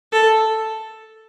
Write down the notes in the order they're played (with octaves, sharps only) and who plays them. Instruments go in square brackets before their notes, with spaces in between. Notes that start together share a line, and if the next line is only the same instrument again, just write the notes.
[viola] A4